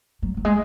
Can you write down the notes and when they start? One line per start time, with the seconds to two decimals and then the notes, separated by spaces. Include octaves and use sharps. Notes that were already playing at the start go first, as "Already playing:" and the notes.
0.22 F#3
0.37 F#3
0.45 G#3